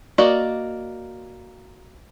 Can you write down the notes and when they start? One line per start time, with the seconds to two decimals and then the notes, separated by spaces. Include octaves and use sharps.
0.18 A#3 F#4 D5 D#5